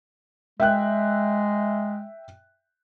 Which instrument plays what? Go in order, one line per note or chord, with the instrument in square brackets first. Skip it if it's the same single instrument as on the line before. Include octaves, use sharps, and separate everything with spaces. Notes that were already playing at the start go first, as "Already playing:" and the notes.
[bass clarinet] G#3 [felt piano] E5 G5 F#6